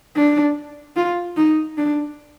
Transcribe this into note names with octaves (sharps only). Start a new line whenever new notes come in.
D4
F4
D#4
D4